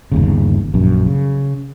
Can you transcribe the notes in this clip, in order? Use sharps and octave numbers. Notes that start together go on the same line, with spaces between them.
G1 D#2 C#3
A#1 F#2
C#3